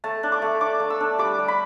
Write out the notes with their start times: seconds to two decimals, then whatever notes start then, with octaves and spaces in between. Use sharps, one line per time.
0.04 A3 A5
0.23 D4
0.32 D6
0.42 A3
0.61 D4 D6
0.80 A3
0.90 E6
1.00 D4
1.19 G3 D6
1.39 G3
1.48 B5